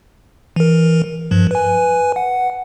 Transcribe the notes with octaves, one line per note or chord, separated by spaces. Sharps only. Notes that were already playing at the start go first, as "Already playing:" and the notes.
E3 A#4
G2 F3
B4 G#5
F#5